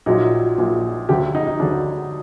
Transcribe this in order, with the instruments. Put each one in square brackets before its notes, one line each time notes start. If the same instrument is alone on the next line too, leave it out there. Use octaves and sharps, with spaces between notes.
[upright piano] A#1 A#2 F#3 D#4
A#1 A#2 F#3
D2 D3 F#3 G4
F#4
D#4
D#4
D2 D3 F#3 D4